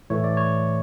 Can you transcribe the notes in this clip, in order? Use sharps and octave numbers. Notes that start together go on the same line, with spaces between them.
A2 E3 A3 C#5
D5
C#5